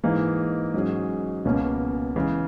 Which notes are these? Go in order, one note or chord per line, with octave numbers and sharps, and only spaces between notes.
G#2 E3 A#3 D#4 G#4
G#2 F#3 C#4 G#4
C#2 B2 A#3 C#4
C#3 E3 G#3